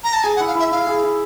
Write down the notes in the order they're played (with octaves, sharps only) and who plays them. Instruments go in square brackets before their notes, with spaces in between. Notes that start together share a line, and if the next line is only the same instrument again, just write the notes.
[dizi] A#5
A5
[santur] G#4 [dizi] G#5
[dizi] F#5
[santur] E4
[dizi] F5
[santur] E4 [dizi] E5
[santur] E4 [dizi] F5
[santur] G#4
E4